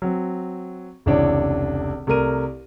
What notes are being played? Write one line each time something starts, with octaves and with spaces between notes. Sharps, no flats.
F#3 C4
F1 C#2 E3 D4 C#5 D5
C2 A3 A#4 D#7